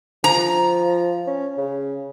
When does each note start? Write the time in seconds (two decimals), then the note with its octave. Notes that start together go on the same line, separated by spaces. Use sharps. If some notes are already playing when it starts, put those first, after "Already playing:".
0.24 F3 A#5
1.27 C#4
1.58 C#3